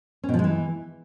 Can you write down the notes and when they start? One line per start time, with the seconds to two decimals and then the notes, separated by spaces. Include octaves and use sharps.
0.24 C#4
0.29 B2
0.34 F3
0.39 G#3
0.44 E3